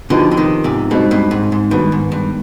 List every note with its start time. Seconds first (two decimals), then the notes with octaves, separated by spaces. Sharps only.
0.10 B2 D3 F3 B3 D#4 G4
0.31 D3
0.37 C3 D#3
0.64 G#2 C3
0.91 G2 B2 G#3 C4 D#4
1.11 G2 B2
1.31 G#2
1.52 G#2
1.71 G2 B2 D#3 G#3 B3
1.92 G#2
2.12 G2